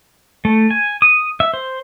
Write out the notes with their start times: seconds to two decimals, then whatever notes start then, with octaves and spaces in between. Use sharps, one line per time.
0.45 A3
0.70 G#5
1.02 D#6
1.40 E5
1.54 C5